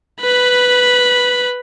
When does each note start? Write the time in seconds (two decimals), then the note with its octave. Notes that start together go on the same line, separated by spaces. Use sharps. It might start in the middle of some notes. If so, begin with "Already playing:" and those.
0.21 B4 B5